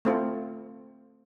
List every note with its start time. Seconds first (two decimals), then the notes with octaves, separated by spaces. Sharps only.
0.05 A3 C4 F4